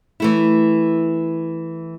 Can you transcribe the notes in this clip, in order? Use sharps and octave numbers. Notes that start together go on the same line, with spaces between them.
E3 A3 E4